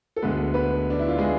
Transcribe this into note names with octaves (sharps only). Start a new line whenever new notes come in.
A4
D2 D3 G#3 B3 B4
B3 B4
D4
E4
F4
G#3 G#4